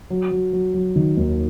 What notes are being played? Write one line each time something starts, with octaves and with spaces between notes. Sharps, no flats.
F#3
F#3
F#3
F#3
D#3
D#2